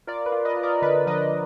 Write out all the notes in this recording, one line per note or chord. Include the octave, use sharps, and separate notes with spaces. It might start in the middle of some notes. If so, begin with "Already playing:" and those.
F4 A#4 D5
B4
F4
B4 D#5
F4
A#4 D5
D3 B4
F3 B4 D#5